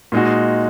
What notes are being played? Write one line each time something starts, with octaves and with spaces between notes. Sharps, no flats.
A#2 G#3 D#4 F#4